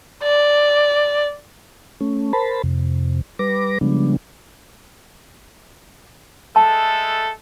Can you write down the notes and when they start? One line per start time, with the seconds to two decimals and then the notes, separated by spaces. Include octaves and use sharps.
0.23 D5
2.01 A3 C#4
2.33 A#4 C5 A5 B5
2.64 F2 C3
3.39 G3 B4 D6 A#6
3.81 C#3 F3 G3 G#3 B3 D4
6.56 G#3 A3 A4 A5